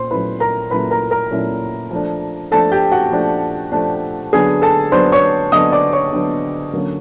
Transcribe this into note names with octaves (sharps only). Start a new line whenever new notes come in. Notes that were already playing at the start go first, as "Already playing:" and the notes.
Already playing: A#2 C5 C6
A#2 F#3 A3 C#4 E4 B4 B5
A#4 A#5
A#2 F#3 A3 C#4 E4 B4 B5
A#4 A#5
A#4 A#5
A#2 F#3 A3 C#4 E4
F3 A3 D4
F3 A3 D4 A4 A5
G4 G5
F#4 F#5
F3 A3 D4
F3 A3 D4
D3 F#3 B3 D4 G#4 G#5
A4 A5
D3 F#3 B3 D4 C5 C6
C#5 C#6
D3 F#3 B3 D4 D#5 D#6
D5 D6
C#5 C#6
D3 F#3 B3 D4
D3 F#3 A#3 C#4